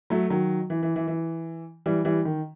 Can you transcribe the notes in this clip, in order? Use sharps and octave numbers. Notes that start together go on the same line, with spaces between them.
F#3 A3
D#3 F#3
E3
E3
E3
E3
E3 G3
E3 G3
D#3